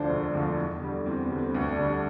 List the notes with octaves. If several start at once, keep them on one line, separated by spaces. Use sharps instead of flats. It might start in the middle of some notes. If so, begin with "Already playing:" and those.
Already playing: D2 D3 F3 D4 C5
E1
D2 D3 F3
E2
D3 G3
E2 C4
B3
D3 G3
C4
B3
D2 C4
D4
D3 G3
D4